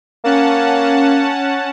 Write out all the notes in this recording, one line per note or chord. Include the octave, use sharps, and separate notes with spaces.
A#3 C#4 F#5 A5